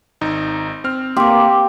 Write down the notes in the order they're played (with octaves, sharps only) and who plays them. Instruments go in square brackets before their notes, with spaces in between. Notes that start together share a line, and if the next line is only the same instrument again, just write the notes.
[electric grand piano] G#1 D#4
C4 F6
[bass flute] A#3 [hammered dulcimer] G4 [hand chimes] C6 D6